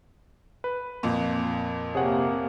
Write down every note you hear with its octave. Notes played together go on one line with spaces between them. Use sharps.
B4
F2 A#2
C3 A#3 G#4 C#5 F#5